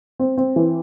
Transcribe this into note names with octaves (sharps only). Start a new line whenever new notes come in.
C4
C4
E3